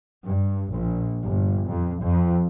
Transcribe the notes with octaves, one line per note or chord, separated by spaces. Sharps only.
G2
A#1
G1
F2
F2